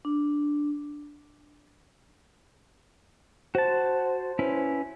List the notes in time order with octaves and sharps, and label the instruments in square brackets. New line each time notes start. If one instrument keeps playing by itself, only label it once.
[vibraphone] D4
[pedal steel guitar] F#4 A5 [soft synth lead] C5
[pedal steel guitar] C#4 E4 B4